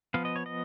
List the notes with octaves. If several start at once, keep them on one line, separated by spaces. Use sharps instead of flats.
F3 B3 F5
D#5
C#5
D#5